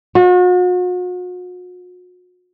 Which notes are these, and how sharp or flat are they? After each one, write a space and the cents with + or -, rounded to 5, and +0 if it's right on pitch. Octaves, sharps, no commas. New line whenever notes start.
F#4 -40